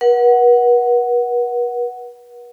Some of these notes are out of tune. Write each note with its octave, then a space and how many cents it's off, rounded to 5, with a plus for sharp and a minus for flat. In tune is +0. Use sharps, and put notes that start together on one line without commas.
B4 -45 F#5 +0